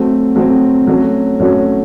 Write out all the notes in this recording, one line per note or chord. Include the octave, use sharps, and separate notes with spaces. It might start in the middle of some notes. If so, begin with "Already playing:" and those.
Already playing: F#3 A3 C4
F#3 A3 C4
F#3 A3 C#4 F#4
F#3 A3 C#4 F#4